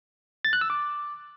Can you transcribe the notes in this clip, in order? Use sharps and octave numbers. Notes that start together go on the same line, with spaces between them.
A6
F#6
E6
D6